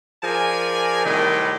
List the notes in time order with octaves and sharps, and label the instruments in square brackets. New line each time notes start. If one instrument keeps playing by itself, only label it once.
[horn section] F3 G#4 A#4 D5 G#5
A2 C3 D#3 F#3 G3